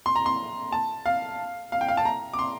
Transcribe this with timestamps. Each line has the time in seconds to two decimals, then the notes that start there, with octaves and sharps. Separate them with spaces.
0.06 C6
0.16 A#5
0.26 C6
0.72 A5
1.06 F5
1.72 F5
1.81 G5
1.88 F5
1.97 A5
2.05 A#5
2.34 D6
2.39 C6